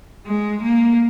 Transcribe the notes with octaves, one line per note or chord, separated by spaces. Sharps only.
G#3
A#3